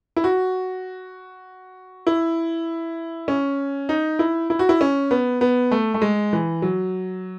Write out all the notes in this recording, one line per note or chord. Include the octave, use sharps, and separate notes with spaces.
E4
F#4
E4
C#4
D#4
E4
E4
F#4
E4
C#4
B3
B3
A3
A3
G#3
E3
F#3